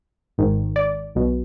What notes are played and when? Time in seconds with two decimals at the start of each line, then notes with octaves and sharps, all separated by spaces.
0.38 G#1 G#2 D#3
0.76 D5
1.15 B1 B2